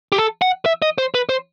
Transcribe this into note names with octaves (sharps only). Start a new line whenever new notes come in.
G4
A4
F#5
E5
D#5
C5
B4
C5